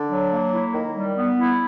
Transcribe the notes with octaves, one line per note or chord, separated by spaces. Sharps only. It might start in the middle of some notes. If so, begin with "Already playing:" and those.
Already playing: D3
F#3
A#3
E4
D#3
G3
B3
E4